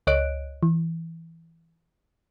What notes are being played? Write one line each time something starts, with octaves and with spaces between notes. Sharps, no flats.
C#2 C#5 D#5 F#6 D7
E3